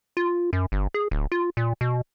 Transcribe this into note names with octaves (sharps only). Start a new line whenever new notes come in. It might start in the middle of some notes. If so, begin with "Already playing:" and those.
F4
F#2
G1
G#4
D1
F4
A#2
B2